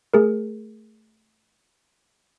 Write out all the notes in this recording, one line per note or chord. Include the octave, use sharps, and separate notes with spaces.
A3 G#4 A#4